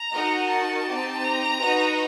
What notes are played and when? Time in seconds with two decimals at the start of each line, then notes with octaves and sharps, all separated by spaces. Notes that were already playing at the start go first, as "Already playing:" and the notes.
Already playing: A#5
0.13 D#4 F#4 A#4 D#5 F#5
0.50 A5
0.87 C4 D#4 G4
1.24 A#5
1.61 D#4 F#4 B4 D#5